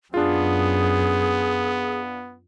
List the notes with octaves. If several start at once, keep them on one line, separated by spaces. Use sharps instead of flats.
F#2 B3 D4 F4 G#4